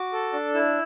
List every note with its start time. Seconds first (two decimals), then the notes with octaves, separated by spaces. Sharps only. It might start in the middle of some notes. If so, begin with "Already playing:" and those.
Already playing: F#4 D6
0.13 A4
0.33 D4
0.54 E4 E6